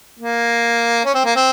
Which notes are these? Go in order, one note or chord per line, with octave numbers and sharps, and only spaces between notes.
A#3
C#4
C4
A#3
C4